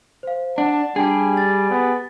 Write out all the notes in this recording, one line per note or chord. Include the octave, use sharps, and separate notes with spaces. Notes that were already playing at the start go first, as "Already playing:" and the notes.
C5 F5
D4 F#5 A5
G3 D4 G4 G#4 G5 A5
A6
B3